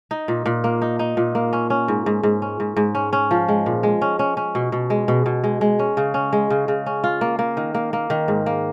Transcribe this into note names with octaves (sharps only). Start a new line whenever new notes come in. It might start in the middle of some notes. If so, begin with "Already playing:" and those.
D#4
A#2
A#2
A#3
D#4
D#4
A#2
A#3
C#4
C#4
G#2
G#2
G#2
C#4
G#2
G#2
C#4
C#4
F3
G#3
A#2
G#3
C#4
C#4
C#4
B2
B2
G#3
B2
B2
G#3
G#3
C#4
C#3
C#4
G#3
C#3
C#3
C#4
F4
A#3
A#3
D#3
A#3
A#3
D#3
G#2
A#3